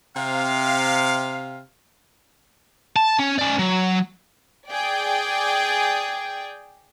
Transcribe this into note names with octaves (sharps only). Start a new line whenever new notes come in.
C3 F5
A5
C#4
C#4 D5
F#3
G#4 D5 G5